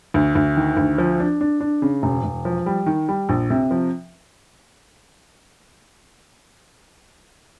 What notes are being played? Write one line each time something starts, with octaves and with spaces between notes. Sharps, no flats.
D2
D2
D#3
D2
F3
D4
D4
D4
C#3
E1
E1
F3
G3
D#3
G3
A#1
C3
F3